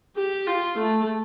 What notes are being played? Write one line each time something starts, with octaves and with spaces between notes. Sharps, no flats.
G4
F4
A3